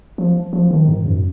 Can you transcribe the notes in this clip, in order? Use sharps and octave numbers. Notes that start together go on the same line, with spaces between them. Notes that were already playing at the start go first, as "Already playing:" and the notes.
F3
F3
D#3
G#2
F#2